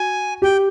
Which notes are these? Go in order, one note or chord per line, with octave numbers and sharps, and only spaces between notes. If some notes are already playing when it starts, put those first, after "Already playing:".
Already playing: F#4 G#5
G4 G5